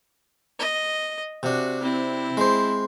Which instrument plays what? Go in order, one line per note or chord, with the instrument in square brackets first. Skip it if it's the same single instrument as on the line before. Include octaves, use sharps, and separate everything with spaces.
[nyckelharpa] D#5
[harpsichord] C3 D4 [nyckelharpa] F#4
[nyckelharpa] C4 E4
[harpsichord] G#3 C5